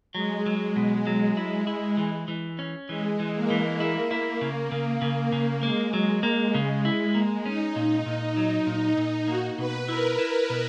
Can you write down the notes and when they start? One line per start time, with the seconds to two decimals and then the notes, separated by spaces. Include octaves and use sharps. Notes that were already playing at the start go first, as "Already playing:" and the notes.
0.15 F#3 G#3
0.46 F#3
0.76 B2
1.07 F#3
1.37 E4
1.67 E4
1.97 E3
2.28 E3
2.59 C#4
2.89 E3 G#3
3.20 E3
3.35 A#3
3.50 E3
3.80 E4
4.11 E4
4.41 C#3
4.72 C#3
5.01 C#3
5.32 C#3
5.63 G#3 A#3
5.93 F#3
6.23 A#3
6.55 C#3
6.85 E4
7.15 A#3
7.45 C#4 D#4
7.76 A#2
8.06 A#2
8.37 F#3
8.66 A#2
8.97 A#2
9.27 A#3 F#4
9.58 B2 B4
9.89 E4 A#4
10.18 E4
10.50 B2